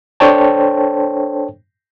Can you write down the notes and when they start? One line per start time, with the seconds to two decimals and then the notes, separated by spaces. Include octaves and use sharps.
0.20 D4 A4 C5 C#5 G5 A5